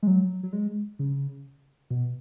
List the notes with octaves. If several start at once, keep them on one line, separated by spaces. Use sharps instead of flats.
G#3
F#3
F#3
G#3
C#3
B2